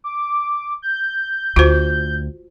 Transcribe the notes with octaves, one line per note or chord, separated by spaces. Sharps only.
D6
G6
D2 F4 F#4 C5